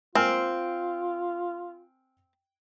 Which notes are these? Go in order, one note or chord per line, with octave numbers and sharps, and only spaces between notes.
C4 F4 A#4 G#5 F6